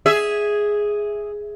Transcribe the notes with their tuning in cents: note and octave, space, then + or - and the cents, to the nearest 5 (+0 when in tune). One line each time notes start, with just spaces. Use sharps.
G#4 +0 E5 -5